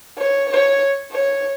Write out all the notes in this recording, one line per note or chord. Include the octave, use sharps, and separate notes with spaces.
C#5
C#5
C#5